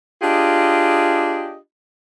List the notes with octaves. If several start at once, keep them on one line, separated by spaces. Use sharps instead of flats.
D4 F4 G4 G#4 D#5